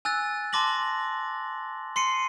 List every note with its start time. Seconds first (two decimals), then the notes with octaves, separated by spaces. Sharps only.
0.05 G#5 E6 F#6 A6
0.53 A5 C6 D6 A#6 F#7
1.96 C6 C7 C#7 D#7